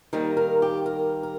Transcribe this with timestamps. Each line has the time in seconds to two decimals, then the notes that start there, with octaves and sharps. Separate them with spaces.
0.13 D#3 G3 A#3 D#4
0.37 A#4
0.62 G4
0.86 A#4
1.23 A#4